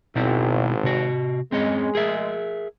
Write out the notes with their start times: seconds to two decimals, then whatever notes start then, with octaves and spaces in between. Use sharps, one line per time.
0.16 G#1 B2 C4 E4
0.84 C3 F#4
1.52 G#3 C4 C#4 D#5
1.95 G#4 A#4 E5